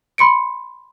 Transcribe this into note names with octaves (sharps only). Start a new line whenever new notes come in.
B5 C6 C#7 D7